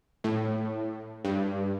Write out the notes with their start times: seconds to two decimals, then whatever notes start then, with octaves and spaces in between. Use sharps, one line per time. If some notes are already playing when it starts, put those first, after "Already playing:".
0.24 A2
1.25 G2